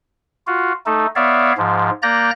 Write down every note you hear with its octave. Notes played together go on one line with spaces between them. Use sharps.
F4 F#4
A3 D#4 A4
B3 C#5 D5 E5 F5
G#2 F3
A#3 D5 A#5 F#6 G6 A#6